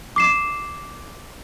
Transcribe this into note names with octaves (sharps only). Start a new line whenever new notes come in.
D6 C7 E7